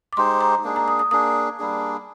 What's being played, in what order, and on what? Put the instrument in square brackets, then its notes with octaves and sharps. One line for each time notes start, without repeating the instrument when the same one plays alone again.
[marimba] D6
[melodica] G#3 D#4 G4 C5 [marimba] C6
[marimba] A#5
[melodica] A#3 D4 G#4
[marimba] A#5
D#6
D#6
[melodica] A#3 D4 G#4 [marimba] D#6
[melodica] G3 A#3 D4 G#4